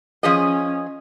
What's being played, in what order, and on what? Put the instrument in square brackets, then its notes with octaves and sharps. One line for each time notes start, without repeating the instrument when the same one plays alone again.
[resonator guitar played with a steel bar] F3 G#4 D#5 [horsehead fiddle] C#4